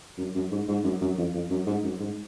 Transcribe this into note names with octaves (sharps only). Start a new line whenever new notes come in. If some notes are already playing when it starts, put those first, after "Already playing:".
F#2
F#2
G#2
G#2
F#2
F#2
F2
F2
F#2
G#2
F#2
G#2